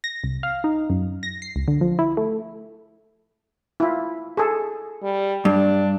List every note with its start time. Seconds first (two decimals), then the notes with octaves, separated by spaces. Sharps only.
0.04 A#6
0.24 C2
0.43 F5
0.64 D#4
0.90 F#2
1.23 A#6
1.42 C7
1.56 C#2
1.68 D3
1.81 F3
1.99 E4
2.17 A3
3.80 E4 F4
4.37 G#4 A4
5.02 G3
5.45 G2 D4